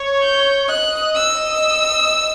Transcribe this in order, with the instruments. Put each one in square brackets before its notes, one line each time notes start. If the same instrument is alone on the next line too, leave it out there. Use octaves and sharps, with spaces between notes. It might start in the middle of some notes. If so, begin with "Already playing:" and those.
Already playing: [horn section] C#5
[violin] G6
[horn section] D#5 [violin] F#6
[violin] E6